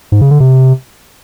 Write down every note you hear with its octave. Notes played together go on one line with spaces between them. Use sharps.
G#2
C#3
D3
C3